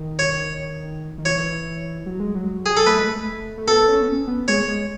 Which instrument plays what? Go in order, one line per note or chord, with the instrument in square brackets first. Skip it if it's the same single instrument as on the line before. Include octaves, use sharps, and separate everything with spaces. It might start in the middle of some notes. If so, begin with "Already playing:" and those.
Already playing: [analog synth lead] D#3
[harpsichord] C#5
[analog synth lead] D#3
[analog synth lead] E3 [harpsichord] C#5
[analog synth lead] F#3
G#3
F#3
[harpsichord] G#4
A4
[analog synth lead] A3 [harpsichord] B4
[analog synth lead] G#3
A3
A3
[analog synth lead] B3 [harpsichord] A4
[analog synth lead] C#4
B3
C#4
B3
[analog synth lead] G#3 [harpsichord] C#5
[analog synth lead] G#3